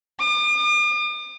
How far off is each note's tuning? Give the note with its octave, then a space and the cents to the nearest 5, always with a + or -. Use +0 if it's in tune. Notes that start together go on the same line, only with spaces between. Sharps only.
D6 +45